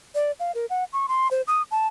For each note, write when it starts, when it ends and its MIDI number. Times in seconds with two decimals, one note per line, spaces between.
0.15 0.32 74
0.40 0.52 77
0.55 0.66 70
0.70 0.84 78
0.93 1.06 85
1.09 1.28 84
1.31 1.42 72
1.48 1.62 87
1.71 1.87 81